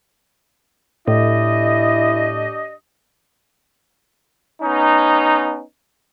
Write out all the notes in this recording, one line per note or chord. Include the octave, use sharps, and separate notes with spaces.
A2 D4 E4 G4 D#5
B3 C#4 D#4